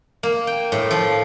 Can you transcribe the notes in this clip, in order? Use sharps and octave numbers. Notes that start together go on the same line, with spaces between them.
A#3
G5
A2
F3